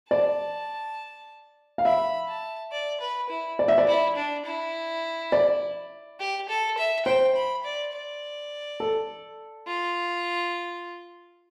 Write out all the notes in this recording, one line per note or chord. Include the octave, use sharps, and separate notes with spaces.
D5 A5
F5
E5 B5
A5
D5
B4
E4
D5
E5
D5
E4
D4
E4
D5
G4
A4
E5
C5 G5
B5
D5
D5
A4
F4